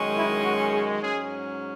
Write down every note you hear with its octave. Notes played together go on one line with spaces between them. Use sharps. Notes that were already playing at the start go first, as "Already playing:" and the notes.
Already playing: F#2 D#3 G#3 C#4
E4
F#4
G#4
G#2 F#3 C#4 G#4